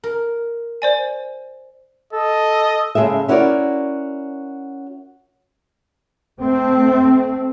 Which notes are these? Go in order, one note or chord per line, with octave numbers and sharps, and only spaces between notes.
A#4
C5 D5 G#5
A4 D#5
C#3 E3 G#3 A4 E5
C#4 E4 F#4 A#4 D5
A3 C4